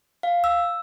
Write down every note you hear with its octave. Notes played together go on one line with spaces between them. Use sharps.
F5
E6